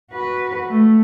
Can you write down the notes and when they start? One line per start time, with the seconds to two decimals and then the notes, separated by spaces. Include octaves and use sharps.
0.12 F#4 B4
0.69 A3